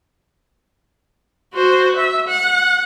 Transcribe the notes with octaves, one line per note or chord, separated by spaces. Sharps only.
F#4 C5
E5
F#5